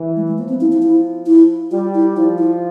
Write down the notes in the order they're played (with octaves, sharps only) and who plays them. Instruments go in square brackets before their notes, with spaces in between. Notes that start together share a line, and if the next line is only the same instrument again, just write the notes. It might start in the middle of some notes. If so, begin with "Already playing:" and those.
Already playing: [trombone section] E3
[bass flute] G#3
G#3
[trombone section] F3 [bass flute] A#3
[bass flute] C4
E4
E4
E4
E4
[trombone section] G3 [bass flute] F4
[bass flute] E4
[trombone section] F3 [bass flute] E4
[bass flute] E4